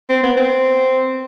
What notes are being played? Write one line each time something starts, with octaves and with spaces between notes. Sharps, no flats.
C4
B3
C4